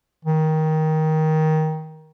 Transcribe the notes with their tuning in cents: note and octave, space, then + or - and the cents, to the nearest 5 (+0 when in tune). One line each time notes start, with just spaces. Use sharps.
D#3 +15